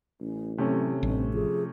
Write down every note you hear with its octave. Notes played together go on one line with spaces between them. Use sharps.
A1 C#4
C3 F#3 A3 C#4
A1 G2 C4
F3 G#4